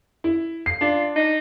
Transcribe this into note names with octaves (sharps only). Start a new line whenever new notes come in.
E4
C7
D4 F4
D#4